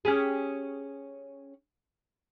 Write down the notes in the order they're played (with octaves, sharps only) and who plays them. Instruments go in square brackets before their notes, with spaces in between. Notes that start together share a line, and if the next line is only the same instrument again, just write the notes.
[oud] C#4 G4 G#4